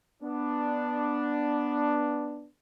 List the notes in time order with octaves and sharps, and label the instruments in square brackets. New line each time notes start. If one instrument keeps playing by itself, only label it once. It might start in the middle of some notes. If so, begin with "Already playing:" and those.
[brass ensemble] B3 D4